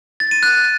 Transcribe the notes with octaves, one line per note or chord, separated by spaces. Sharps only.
A6
D#7
F#6